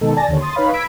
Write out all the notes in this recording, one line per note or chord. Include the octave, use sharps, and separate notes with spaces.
B2 D#3 G#3 D#4 A4
D5 G#5 A5 A6 A#6
D#2 D3 C#5
C6 D#6 A6
D#4 B4 C#5 F5 B5
B5 E6 G#6 B6 D7